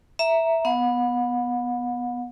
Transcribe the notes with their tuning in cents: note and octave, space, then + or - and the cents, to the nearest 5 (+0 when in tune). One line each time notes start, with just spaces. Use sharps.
E5 +0 A#5 +0
B3 +0 F#5 -40